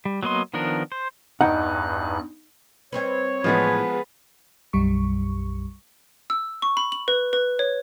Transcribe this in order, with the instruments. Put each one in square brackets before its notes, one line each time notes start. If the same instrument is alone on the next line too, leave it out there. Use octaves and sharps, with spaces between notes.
[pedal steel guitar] G3
F#3 A#3 B3 D#5 C6
D#3 F3 B3 D4 A#4
C5
[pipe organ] E2 G2 F#6 [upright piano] D#4 [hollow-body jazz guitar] F#5 G5
[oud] G3 C4 B4 [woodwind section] C#5
[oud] A2 E3 G3 [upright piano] F3 G#3 B3 [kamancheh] G#4 B4
[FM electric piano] B1 F#2 G3 C#6
[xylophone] E6
C#6
B5
F#7
B4
B4
C#5